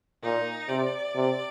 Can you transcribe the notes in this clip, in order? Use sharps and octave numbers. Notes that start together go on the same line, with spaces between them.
A#2 D#4
C3 D5
C3